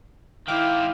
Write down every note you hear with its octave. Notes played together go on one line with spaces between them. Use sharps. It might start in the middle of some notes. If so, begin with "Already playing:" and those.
D#3 C4 E4 F5 G5 D6